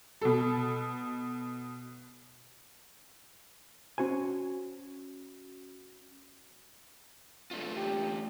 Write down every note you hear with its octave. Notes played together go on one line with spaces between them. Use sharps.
B2 A4
C#4 F#4 C5 G#5
A3 D4 F4
G4